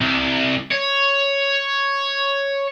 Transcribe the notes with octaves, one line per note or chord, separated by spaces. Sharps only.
C2
C#5